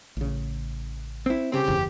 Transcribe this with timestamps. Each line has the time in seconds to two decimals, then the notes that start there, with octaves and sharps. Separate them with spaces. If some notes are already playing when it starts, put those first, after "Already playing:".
0.17 A1 C#3
1.26 C4 E4
1.52 C2 C#3 C4 G4
1.68 F#1 E2